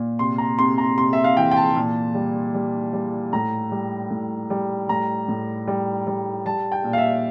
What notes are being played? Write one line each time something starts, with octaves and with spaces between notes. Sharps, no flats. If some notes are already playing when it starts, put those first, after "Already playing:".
Already playing: A#2
C3 C6
A#5
C3 C6
A#5
C3 C6
E5
F5
E3 G5
G5
A5
A#2
G3
G3
G3
A2 A#5
G3
A2
G3
A2 A#5
A2
G3
G3
G3 A5
G5
A#2
F5
E5